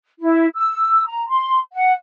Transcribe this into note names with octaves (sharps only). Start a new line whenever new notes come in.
E4
E6
A#5
C6
F#5